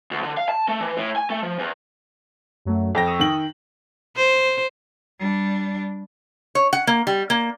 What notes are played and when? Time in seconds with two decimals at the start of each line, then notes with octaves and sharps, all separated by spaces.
0.11 D2
0.23 D3
0.37 F5
0.49 A5
0.68 A3
0.81 E3
0.97 A2
1.16 G#5
1.30 A3
1.43 F3
1.59 E2
2.65 F#2 F#3 A3
2.95 F2 G5 A#6
3.06 C#6 D#6 E6
3.20 D#3 G5 F#7
4.16 C5
5.19 G3 D4
6.55 C#5
6.73 F#5
6.87 A#3
7.07 G3
7.30 A#3